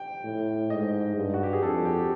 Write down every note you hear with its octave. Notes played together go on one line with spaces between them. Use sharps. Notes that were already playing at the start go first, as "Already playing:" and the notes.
Already playing: G5
A2
G#2 D#5
G2
F#4
G4
G#4
F2 A4
G4